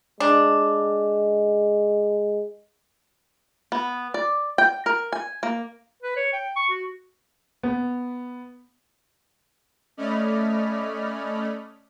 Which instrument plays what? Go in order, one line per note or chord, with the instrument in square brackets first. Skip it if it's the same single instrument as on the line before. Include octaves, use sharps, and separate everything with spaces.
[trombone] G#3 [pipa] D4
[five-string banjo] B3
D5
G5
A#4
G#5
A#3
[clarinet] B4
C#5
G5
C#6
F#4
[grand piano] B3
[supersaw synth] A3 C#4 D5 D#5 B5 F6